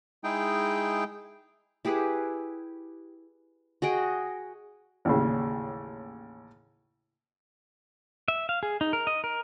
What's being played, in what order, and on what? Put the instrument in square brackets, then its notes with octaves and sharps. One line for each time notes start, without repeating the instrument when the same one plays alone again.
[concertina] G#3 D#4 E4 G#4 G5
[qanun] E4 G4 G#4 B4
F#4 G#4 D#5 G5
[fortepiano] A1 D#2 A#2 C#3
[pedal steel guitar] E5
F5
G#4
D#4
A#4
D#5
A#4